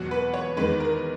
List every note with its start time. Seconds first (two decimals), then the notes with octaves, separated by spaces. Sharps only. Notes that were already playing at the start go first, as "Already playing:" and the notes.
Already playing: E2 B2 F#3 F#4
0.11 B4
0.34 C#5
0.57 E2 D#3 G#3 B4
0.80 A#4